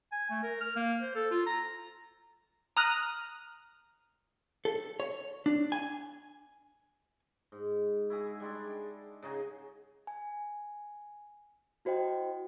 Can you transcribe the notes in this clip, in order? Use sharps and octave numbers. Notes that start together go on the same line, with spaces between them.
G#5
A3
A#4
F6
A#3
C5
A4
F4
A#5
A#5 D#6 F6 F#6
A4
C#5
D4
G#5
G#2
E4 F#4 G#4
G3 G#3 D4
C#3 D#4 F#4 G#4
G#5
E4 F#4 C5 D#5 G5